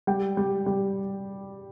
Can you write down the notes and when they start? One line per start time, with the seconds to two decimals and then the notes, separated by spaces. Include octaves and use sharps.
0.07 G3 G5
0.37 G3
0.66 G3